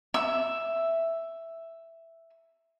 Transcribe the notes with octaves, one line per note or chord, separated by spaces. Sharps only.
E5 E6